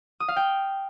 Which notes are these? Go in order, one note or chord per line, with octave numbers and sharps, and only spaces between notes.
D#6
F5
G5